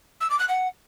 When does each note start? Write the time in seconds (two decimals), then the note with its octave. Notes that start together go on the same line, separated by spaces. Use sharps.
0.20 E6
0.30 D6
0.39 F#6
0.48 F#5